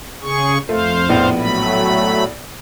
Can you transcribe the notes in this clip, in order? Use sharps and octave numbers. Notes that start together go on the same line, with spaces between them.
C#3 G#4 C#6
F2 A3 C5 F5
A#1 A2 B3
F#3 A3 B5